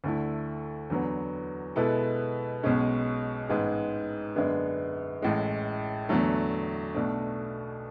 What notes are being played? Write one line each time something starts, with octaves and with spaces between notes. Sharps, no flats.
D2 D3 A3 E4
E2 D3 F#3 B3
B2 G#3 B3 E4 A4
B1 B2 G#3 C#4
A1 G#2 G#3 B3
F#2 D3 G#3 B3 D4
A1 A2 G#3
E2 D3 F#3 A3
B1 B2 A3 D4